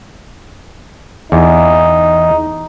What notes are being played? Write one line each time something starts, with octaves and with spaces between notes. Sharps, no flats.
E2 D#4